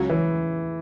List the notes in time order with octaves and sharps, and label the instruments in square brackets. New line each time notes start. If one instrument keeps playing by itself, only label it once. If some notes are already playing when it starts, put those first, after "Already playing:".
Already playing: [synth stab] C#2 C#3 F#3 C#4
[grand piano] E3